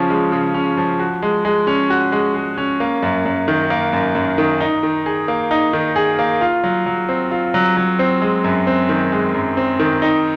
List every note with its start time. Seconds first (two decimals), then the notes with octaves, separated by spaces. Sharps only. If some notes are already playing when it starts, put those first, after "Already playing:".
Already playing: C#3 F3 C#4
0.10 G#3
0.32 C#3
0.54 C#4
0.77 F3
1.00 F#4
1.22 G#3
1.45 G#3
1.67 C#4
1.90 F#4
2.12 G#3
2.35 G#3
2.58 C#4
2.80 A#3
3.02 F#2
3.25 F#2
3.48 D#3
3.70 A#3
3.93 F#2
4.15 F#2
4.38 D#3
4.60 D#4
4.83 D#3
5.06 G#4
5.28 A#3
5.51 D#4
5.73 D#3
5.96 G#4
6.19 A#3
6.41 F4
6.64 F#3
6.86 F#3
7.09 C4
7.31 F4
7.54 F#3
7.77 F#3
7.99 C4
8.21 G#3
8.44 F#2
8.67 C4
8.89 D#3
9.12 G#3
9.34 F#2
9.57 C4
9.80 D#3
10.02 D#4